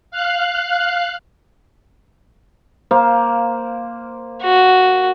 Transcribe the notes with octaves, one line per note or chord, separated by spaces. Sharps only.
F5 F#6
A#3 C5 F5
F#4